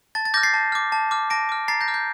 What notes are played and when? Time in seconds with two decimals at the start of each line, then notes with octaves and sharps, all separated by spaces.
0.15 A5 A6
0.25 A6
0.34 D6 F6 G6 A#6
0.43 A6 C7
0.54 A5
0.72 D6 F6
0.92 A5
1.11 D6 F6
1.30 A5 A#6 D7
1.49 D6 F6
1.68 A#5 A6 C7
1.81 G6 A#6
1.88 D6 F6
1.94 G6